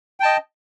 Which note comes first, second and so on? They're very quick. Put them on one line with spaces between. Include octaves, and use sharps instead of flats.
G5 A5 D#5